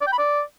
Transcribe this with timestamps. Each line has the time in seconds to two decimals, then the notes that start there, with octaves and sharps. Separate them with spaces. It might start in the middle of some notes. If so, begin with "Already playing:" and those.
0.01 D5
0.07 G5
0.12 B5
0.18 D5